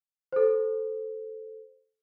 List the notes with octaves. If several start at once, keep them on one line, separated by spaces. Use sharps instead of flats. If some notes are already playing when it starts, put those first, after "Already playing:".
A4 C5